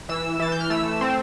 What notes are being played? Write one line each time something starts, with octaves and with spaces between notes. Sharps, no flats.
E3 E6
E3 A6
G6
F6
A3 E6
C4